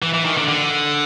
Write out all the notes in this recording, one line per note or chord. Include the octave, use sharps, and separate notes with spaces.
E3
E3
D#3
D3
D3